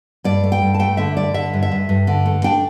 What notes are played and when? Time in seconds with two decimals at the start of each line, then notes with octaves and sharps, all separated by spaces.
0.24 G2 D5
0.44 A3
0.52 G5
0.62 G2
0.75 A5
0.79 A3 G5
0.97 D3 E5
1.17 G2 D5
1.34 D3 E5
1.53 G2
1.63 E5
1.72 G2
1.89 G2
2.07 D3
2.26 A3
2.44 D4 G5